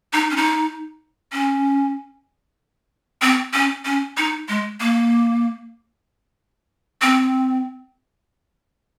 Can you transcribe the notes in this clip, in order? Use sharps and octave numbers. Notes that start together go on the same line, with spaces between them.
D#4
C#4
D#4
C#4
C4
C#4
C#4
D#4
G#3
A#3
C4